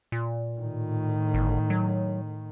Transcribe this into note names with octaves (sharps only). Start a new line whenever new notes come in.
A#2
A2 D#3
G1
F#3